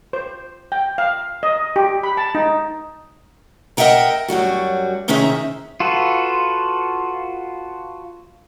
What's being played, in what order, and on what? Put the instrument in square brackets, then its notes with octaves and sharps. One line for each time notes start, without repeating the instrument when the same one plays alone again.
[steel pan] C5
G5
F5
D#5
G4
B5
A5
D#4
[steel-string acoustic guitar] A#4 D#5 E5 F#5 G5 A#5
F#2 F#3 G3 F#4
C3 D#3 C#4 D#4 G#4 E5
[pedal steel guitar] F4 F#4 A4 B4